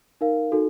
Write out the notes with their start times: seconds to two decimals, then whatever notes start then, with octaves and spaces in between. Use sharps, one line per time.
0.21 D#4 A#4 F5
0.52 D#4 F#4 A4